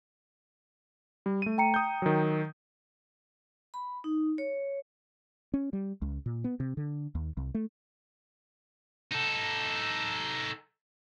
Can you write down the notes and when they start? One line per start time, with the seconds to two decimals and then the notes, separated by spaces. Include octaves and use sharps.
1.26 G3
1.42 A3 D#7
1.58 G5 A#5 C#7
1.74 D#6 G6
2.02 D#3 F#3
3.74 B5
4.04 D#4
4.38 C#5
5.54 C#4
5.73 G3
6.02 C#2
6.26 A#2
6.44 B3
6.60 C3
6.77 D3
7.15 D#2
7.37 C2
7.54 A3
9.12 D#4 A4